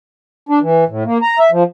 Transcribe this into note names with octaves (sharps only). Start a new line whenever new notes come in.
D4
E3
A2
A#3
A#5
E5
F3